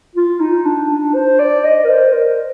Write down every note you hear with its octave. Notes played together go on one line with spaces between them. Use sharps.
F4
D#4
D4
D4
C5
D5
D#5
A#4
C5
A#4